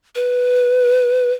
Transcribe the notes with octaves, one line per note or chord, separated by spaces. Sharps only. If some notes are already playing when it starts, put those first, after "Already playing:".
B4